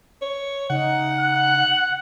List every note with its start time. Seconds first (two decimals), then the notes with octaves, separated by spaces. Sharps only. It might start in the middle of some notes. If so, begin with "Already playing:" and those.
0.22 C#5
0.70 C#3 D#4 F#5
1.20 F#6